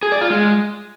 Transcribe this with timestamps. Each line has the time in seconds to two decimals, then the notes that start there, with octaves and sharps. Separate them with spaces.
0.03 G#4
0.12 D5
0.21 F4
0.30 G#3